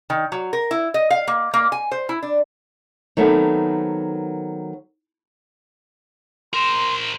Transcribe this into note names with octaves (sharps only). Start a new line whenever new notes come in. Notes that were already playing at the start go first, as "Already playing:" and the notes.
D#3
F#3
A#4
E4
D#5
F5
A#3
A#3
G#5
C5
E4
D4
D#3 F#3 A3 B3 C4
A#4 C5 C6